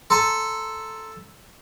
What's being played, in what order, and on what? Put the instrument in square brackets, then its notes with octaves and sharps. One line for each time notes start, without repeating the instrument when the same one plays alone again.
[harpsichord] A4 [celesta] A#5 C6